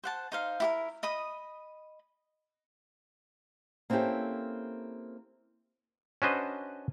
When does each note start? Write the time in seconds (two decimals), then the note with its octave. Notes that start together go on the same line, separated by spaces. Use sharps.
0.04 C5 F#5 A5
0.32 D#4 C5 F5
0.60 E4 G4 A#4
1.03 D#5 B5 D#6
3.90 A#3 C4 C#4 E4 G4 A4
6.22 C#4 D4 F#4 B4 C5 D#5